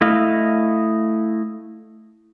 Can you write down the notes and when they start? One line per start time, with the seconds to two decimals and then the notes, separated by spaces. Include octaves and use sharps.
0.01 A3 E4 D#5 F5